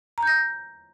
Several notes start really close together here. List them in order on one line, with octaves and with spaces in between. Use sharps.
A#5 G6 A#6